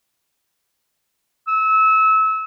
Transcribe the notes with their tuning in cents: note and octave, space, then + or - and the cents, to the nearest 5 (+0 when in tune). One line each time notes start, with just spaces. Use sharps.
E6 -30